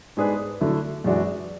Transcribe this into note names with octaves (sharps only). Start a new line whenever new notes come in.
G#2 G#3 D4 G#4 B4
D3 F#3 A3 E4
F#2 E3 G#3 D4 F#4